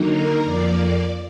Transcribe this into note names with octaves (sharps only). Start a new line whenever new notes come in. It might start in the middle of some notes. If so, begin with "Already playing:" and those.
Already playing: D3 F#3 A#3 D#4
A#4
F2 F3 A#3 D5